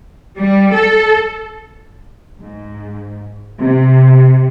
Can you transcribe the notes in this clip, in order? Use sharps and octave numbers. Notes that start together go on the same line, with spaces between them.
G3
A4
G#2
C3